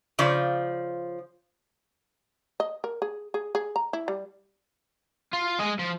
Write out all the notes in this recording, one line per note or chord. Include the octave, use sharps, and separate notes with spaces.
C#3 F3 D5
D#5
A#4
G#4
G#4
G#4
A#5
E4
G3
F4
G#3 D#5
F3